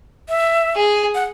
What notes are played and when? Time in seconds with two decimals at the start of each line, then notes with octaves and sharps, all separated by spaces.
0.29 E5
0.76 G#4
1.15 F#5